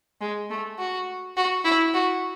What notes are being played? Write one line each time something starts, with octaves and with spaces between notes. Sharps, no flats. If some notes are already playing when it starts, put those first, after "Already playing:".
G#3
A3
F#4
F#4
E4
F#4